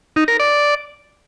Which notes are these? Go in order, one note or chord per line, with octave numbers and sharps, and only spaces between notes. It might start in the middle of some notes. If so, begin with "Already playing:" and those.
D#4
A#4
D5